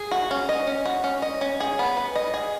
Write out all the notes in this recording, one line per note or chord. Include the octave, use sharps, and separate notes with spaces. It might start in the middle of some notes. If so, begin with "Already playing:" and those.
Already playing: G#4
F#4
C#4
D#5
C#4
F#4
C#4
D#5
C#4
G#4
B3
B4
D#5
G#4